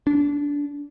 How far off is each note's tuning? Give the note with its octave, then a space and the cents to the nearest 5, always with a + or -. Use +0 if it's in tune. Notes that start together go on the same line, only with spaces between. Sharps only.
D4 -20